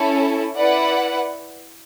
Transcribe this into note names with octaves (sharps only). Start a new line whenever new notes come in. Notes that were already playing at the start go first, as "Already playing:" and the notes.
Already playing: C#4 E4 A4
E4 B4 D5 F#5